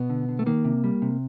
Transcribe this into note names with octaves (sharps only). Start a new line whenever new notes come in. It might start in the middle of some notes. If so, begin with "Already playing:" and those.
Already playing: B2 B3
D3
D3
A3
D#3 A#3
C3
G3
C3